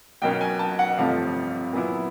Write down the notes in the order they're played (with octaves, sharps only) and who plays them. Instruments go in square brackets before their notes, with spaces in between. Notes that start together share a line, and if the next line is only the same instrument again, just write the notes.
[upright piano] B1 B2 F#3 A#3 C#4 G5
G#5
A5
F#5
G1 F2 C3 F3 A3 F5
A#2 F#3 B3 E4